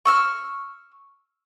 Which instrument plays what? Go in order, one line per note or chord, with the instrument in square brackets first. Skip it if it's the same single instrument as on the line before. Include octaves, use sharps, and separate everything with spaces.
[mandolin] C#6 E6 F6